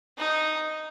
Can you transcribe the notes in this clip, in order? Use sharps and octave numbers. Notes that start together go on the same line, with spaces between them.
D#4